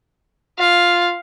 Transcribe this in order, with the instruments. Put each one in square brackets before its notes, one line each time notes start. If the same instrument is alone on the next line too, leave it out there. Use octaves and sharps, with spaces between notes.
[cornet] F4 [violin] F5